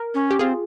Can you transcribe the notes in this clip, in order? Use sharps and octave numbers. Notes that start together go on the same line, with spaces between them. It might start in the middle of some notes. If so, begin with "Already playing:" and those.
Already playing: A#4
C#4
G4
C4 F4 G#4